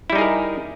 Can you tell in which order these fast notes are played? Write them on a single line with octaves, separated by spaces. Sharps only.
E4 G3 D#4 G#4 A#4